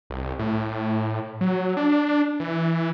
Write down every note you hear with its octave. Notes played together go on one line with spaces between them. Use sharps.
C2
A2
F#3
D4
E3